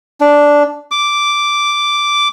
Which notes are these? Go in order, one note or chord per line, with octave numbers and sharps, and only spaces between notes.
D4
D6